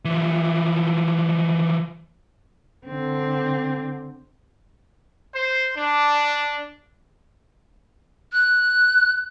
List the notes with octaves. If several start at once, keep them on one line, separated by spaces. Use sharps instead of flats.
E3 F3
D3 C4
C5
D4
F#6